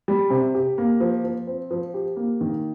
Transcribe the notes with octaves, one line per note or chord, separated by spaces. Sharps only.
G3
C3
G4
A#3
F3
F3
C4
F3
G4
A#3
D#3